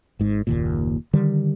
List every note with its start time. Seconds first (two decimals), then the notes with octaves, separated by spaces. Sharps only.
0.19 G#1 G#2
0.47 F#1 D#2 A#2
1.13 D3 D#3 G3